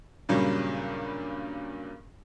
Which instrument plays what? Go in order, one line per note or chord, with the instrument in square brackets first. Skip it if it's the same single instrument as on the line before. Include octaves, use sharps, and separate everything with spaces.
[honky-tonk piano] G2 A#2 C#3 F#3 G3